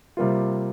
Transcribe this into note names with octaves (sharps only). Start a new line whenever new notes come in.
C3 G3 A#3 F4